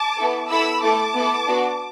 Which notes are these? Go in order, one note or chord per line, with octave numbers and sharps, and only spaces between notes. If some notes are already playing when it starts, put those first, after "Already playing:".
Already playing: A5 D6
B3 E4 A4
B3 E4 A4 B5 E6
A3 E4 A4 A5 D6
B3 E4 A4
B3 D4 F#4